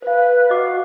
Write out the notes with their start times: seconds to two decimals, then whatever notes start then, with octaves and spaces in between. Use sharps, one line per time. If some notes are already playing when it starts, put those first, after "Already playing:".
0.02 B4 C5 F5
0.50 F#4 D#5 F5 D6